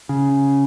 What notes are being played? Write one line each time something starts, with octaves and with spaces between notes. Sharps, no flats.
C#3